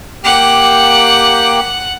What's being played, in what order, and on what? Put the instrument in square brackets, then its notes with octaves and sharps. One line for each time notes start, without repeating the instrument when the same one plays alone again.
[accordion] A#3 G4 G5 [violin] F#5